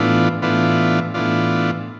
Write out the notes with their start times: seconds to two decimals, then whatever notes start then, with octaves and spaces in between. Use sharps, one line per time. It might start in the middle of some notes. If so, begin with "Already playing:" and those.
Already playing: A2 E3 B3 D4 F4
0.42 A2 E3 B3 D4 F4
1.14 A2 E3 B3 D4 F4